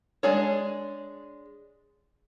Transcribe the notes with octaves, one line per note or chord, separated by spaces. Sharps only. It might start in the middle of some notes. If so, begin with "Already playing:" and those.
G#3 D4 G#4 C#5